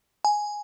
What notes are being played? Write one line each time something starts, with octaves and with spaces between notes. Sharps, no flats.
G#5